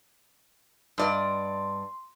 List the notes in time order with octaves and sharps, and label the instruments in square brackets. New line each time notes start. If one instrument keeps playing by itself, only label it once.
[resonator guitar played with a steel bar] G2 D5 D#5 [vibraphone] C6